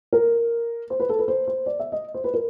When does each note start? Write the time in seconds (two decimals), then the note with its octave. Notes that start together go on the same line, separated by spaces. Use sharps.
0.13 A#4
0.90 C5
1.00 B4
1.09 A4
1.19 B4
1.28 C5
1.47 C5
1.66 D5
1.80 E5
1.92 D#5
2.14 C5
2.24 B4
2.34 A#4